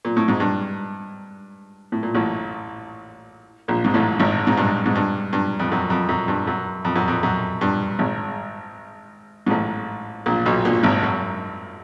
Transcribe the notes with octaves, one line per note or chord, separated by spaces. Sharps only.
A#2
A2
G#2
G2
A2
A#2
A1 A2
A#1 A#2
G#2
A1 A2
G#1 G#2
G#2
G2
G#2
G2
G2
F2
F#2
F2
F#2
G2
F#2
F2
F#2
F2
F#2
G2
G#1 G#2
G#2
A1 A2
A#1 A#2
B1 B2
A#1 A#2
G#1 G#2
F#2